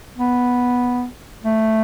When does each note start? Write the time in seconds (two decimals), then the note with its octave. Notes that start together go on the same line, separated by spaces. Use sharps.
0.18 B3
1.44 A3